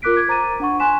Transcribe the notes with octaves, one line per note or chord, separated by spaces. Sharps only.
F4 A#4 D6 F#6 B6 D7
G#6
C5 A#5 D6 A6 D#7
D4 F#5 C#6
G#5 C6 F#6 B6 E7